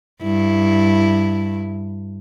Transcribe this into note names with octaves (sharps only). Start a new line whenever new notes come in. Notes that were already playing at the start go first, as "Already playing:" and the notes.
G2 E4